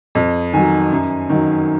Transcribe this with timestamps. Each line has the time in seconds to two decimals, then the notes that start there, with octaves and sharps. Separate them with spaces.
0.15 F2
0.53 D#3 F#3 G#5
0.92 F#2
1.29 D#3 F#3